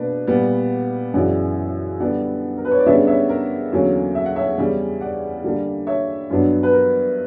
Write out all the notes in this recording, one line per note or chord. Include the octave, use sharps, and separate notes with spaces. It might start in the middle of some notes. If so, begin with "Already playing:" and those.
Already playing: B2 A#3 D4 B4 D5
A#2 G3 B3
F#2 C#3 E3 D5 F#5
D3 G3 B3 D4 D5 F#5
A#4
B4
C#5
D5
C#3 G3 B3 D4 C#5 E5
C#5 E5
A#4
E2 D3 F#3 A#3 C#4
E5
F#5
C#5 E5
E2 C#3 G3 C#4
D5 F#5
D3 G3 A#3 D4
C#5 E5
G2 F#3 B3 D4
B4
A#4